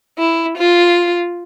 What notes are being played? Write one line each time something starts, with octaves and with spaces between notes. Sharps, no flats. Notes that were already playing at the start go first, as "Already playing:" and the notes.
E4
F4